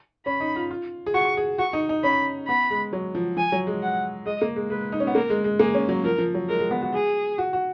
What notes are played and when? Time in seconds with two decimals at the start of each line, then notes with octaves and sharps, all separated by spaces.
0.26 C#4 B5
0.40 D#4
0.56 F4
0.71 F4
1.06 G#4
1.14 F#4 C#6
1.37 G#4
1.58 F#4 C#6
1.73 D#4
1.89 D#4
2.03 C#4 B5
2.48 B3 B5
2.70 G#3
2.93 F#3
3.15 F3
3.37 F3 G#5
3.52 F#3
3.67 G#3
3.82 F#5
4.25 G#3 D#5
4.41 A#3
4.56 G#3
4.70 G#3 B4
4.92 D#4
5.00 C#4
5.07 B3
5.15 A#3 A#4
5.30 G#3
5.44 G#3
5.59 A#3 G#4
5.74 C#4
5.89 F#3
6.04 F3 A#4
6.18 F3
6.34 F#3
6.49 G#3 A#4
6.59 G#3
6.71 B3
6.82 F#4
6.93 G#4
7.38 F#4
7.53 F#4